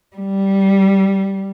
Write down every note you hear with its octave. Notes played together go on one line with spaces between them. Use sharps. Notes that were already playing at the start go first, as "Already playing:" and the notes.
G3